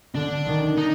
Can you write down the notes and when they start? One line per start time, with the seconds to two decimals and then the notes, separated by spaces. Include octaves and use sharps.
0.15 D3 D4
0.46 D#3
0.78 D#4